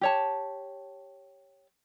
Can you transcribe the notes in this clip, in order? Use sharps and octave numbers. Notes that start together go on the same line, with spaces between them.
G4 C#5 A5